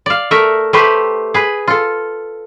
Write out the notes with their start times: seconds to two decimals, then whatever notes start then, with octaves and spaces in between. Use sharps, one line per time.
0.06 D5 F5
0.31 A3 A#4 E5
0.73 A3 G4 B4 C5
1.34 G#4 B4
1.68 F4 A4